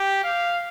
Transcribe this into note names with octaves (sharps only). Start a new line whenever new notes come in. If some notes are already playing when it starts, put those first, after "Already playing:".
Already playing: G4
F5